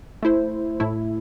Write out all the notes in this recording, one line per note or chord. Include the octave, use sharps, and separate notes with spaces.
A3 E4 C5
A2 A3 E4